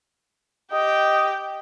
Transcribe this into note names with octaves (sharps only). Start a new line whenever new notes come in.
G4 D#5 G5